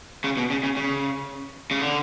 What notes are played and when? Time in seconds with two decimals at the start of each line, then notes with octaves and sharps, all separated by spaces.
0.24 C#3
0.37 B2
0.50 C#3
0.63 C#3
0.77 C#3
1.71 C#3
1.81 D3